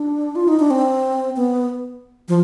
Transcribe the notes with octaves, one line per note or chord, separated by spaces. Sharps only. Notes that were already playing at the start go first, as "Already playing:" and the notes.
Already playing: D4
F4
D#4
D4
C4
B3
F3